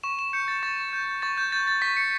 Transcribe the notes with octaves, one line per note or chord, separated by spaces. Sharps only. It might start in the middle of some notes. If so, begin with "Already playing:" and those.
C#6 E7
E7
G6 C#7
A6
C#6 A6
G6
C#6 A6
G6
G6 A6
A6
C#6 B6
C#7